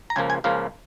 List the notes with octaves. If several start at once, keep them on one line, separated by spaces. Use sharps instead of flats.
A#5
C#2 C#3 F3 A#3 G#5
G#5
C#2 C#3 F3 A#3 F5